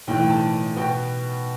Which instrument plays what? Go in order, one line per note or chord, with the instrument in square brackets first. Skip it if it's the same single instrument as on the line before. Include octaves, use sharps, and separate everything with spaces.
[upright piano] B1 A2 E3 G5
G5
A5
B2 B3 G5